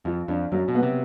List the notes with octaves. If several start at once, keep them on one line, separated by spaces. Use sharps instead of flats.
F2 F4
F2 D4
F#2 F#3
B2
B3
C3